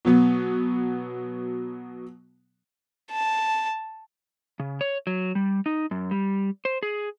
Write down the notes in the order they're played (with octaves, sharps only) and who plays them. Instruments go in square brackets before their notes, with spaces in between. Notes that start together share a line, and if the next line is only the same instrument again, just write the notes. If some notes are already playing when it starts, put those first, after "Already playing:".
[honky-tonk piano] B2 F#3 B3
[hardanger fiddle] A5
[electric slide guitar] C#3
C#5
F#3
G3
D#4
F#2
G3
C5
G#4